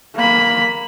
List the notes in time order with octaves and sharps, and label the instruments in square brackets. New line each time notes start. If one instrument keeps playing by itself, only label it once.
[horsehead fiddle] A#3 B5